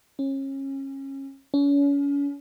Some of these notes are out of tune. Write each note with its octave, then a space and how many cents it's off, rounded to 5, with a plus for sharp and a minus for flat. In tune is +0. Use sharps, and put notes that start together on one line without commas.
C#4 -30
C#4 +35